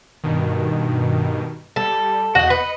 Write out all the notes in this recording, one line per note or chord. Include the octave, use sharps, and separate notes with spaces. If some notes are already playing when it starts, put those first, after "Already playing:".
G2 B2 D#3
G3 A4
E2 F#4 D#5 F#5 G6
B4 D#5 C#7